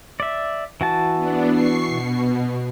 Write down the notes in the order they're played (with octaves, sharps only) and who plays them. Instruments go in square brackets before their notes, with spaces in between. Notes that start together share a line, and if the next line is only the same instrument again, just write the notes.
[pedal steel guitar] D5 E5
E3 F#4 A5
[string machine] B3 D4
C#6 C7
B2